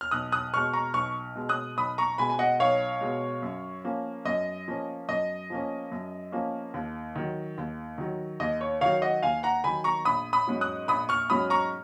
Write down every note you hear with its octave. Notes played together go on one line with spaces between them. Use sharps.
F6
B1 D#6 F#6
D#6 F#6
B2 G#3 C#6 F6
A#5 C#6
B1 C#6 F6
B2 G#3
D#6 F#6
B1 B5 D#6
A#5 C#6
B2 G#3 G#5 B5
G#5
D#5 F#5
B1 C#5 F5
B2 G#3
F#2
F3 A#3 C#4
F#2 D#5
F3 A#3 C#4
F#2 D#5
F3 A#3 C#4
F#2
F3 A#3 C#4
D#2
D#3 F#3
D#2
D#3 F#3
D#2 D#5
C#5
D#3 F#3 C#5 F5
D#5 F#5
D#2 F5 G#5
F#5 A#5
D#3 F#3 G#5 B5
A#5 C#6
A#1 B5 D#6
B5 D#6
G#2 F#3 C#4
D#6 F#6
A#1 B5 D#6
C#6 F6
G#2 F#3 C#4 B5 D#6
A#5 C#6